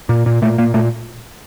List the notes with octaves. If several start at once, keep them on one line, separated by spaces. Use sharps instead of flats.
A#2
A#2
A#2 A3
A#2 A#3
A#2 A3